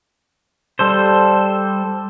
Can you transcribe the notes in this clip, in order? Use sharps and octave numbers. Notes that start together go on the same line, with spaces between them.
G3 A4 C5